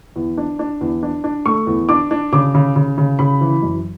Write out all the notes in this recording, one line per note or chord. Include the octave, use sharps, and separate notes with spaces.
E2
D4
D4
E2
D4
D4
A3 C#6
E2
D4 D6
D4
C#3 D6
C#3
C#3
C#3
C#3 B5
E3
F#2